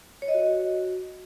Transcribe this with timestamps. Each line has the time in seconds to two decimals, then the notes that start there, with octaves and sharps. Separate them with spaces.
0.22 C#5
0.28 D#5
0.34 F#4